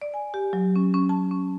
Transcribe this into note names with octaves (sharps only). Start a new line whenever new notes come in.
D5
G#5
G4
F#3
C#4
C#4
A5
C#4